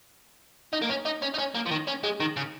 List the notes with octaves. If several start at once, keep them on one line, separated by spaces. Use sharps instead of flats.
D#4
A#3
C#4
D#4
C#4
D#4
C#4
A#3
F3
D#3
C#4
G#3
D#3
C#3